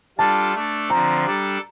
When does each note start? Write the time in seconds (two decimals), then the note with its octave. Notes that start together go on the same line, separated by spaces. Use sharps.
0.18 G3 D4 F4 A4 A5
0.54 A3 D4 A4
0.90 D3 F3 C4 A#5
1.26 G3 D4 A4